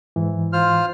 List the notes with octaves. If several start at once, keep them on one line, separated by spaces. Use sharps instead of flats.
G#2 E3
F4 C5 F6